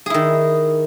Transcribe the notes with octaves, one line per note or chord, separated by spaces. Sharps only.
D#3 E4 G#4